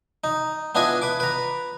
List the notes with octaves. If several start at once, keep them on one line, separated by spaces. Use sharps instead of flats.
D#4
B3 D4 E4 F4 D#5 G#5
B4 D6
B4 A#5